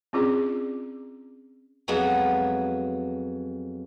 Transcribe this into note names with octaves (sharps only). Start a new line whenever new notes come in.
C4 C#4 F4 G#4 D5
F2 F#3 G#3 B3